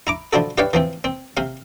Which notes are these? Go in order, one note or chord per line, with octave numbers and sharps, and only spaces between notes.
E4 A#5 D6
F3 D4 E4 F#4 A4
E4 G4 B4 C#5 D5 F5
E3 F3 C4
C4
C3 F5